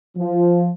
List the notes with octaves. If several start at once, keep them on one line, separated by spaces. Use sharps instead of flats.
F3